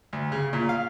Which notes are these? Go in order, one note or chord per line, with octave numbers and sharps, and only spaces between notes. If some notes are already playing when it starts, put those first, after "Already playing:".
D2
C#3
A#2
F5